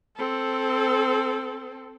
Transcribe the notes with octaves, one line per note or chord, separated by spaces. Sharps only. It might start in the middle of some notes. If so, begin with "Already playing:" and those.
C4 A4